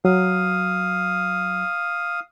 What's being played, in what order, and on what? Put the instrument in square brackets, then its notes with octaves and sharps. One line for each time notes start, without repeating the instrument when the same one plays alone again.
[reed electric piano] F#3 [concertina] F5 D#6